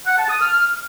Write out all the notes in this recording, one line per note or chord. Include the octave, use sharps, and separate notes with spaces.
F#5
A5
D#6
F6